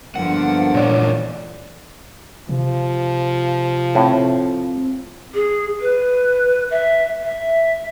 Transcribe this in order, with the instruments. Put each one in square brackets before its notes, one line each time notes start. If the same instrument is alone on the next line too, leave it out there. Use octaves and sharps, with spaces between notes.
[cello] G2 D3 [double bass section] F3 A#3 B3 [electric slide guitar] F#5
[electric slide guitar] A#2 E3 [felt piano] C#5 D5
[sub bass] C3 [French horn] F3
[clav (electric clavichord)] A2 [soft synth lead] C4
[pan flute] G#4
B4
E5
E5